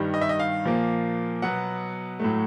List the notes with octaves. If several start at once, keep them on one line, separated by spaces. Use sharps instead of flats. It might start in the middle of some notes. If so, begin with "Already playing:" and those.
Already playing: G2 D#3 G3
D#5
E5
D#5
F5
A#2 F3 A#3
B2 F#3 B3 F#5
A2 F#3 A3